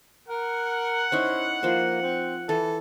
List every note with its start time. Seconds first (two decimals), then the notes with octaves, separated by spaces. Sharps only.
0.28 A#4 F#5
1.12 C#4 D#4 E4 C5
1.63 F3 A#3 C5
2.02 C4
2.49 E3 A4